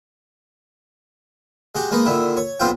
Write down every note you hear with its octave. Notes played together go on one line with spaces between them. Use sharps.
G#3 F#4 G4
G#3 A#3 B3 D#4
A#2 D3 D#3 E4
C#5
B1 B3 C4 F4 G5